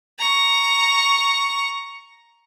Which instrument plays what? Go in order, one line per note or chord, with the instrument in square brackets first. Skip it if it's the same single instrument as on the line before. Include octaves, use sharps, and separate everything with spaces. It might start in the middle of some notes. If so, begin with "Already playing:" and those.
[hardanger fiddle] A#5 C#6